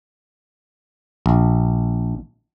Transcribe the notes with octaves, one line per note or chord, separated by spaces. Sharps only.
A#1